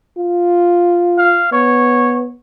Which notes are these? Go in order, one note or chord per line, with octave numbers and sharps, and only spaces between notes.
F4
F5
B3 C#5